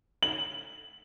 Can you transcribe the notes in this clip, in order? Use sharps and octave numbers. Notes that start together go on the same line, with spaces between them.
F#7